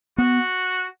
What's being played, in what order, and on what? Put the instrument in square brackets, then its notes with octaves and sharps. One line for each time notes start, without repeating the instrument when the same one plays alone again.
[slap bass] B3 [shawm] F#4